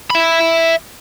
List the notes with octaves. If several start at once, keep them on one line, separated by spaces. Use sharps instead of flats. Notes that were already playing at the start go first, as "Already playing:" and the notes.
E5 B5